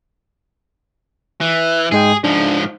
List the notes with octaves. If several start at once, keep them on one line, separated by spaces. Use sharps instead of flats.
E3
G#2 G#3 G#4 G5
G#2 F3 D4